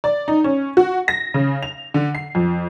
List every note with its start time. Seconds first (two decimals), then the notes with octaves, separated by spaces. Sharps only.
0.04 D5
0.28 D#4
0.44 C#4
0.77 F#4
1.08 A#6
1.34 C#3
1.63 F7
1.94 D3
2.15 C7
2.35 F2